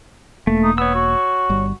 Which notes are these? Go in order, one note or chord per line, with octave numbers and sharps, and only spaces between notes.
E1 A3 A#3
D#4
B3 C#5 E6
F#4
G1 G3